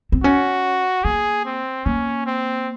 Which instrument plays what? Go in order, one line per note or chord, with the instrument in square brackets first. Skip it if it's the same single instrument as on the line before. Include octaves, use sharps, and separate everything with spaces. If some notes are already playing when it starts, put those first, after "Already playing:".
[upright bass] C4
[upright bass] C#4 [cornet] F#4
[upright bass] A#3 [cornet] G#4
[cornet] C4
[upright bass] A#3 [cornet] C#4
[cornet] C4